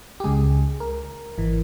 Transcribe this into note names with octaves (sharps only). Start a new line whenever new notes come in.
G4
C#2 C#3 G#3 G#4
A#4
G#1 E3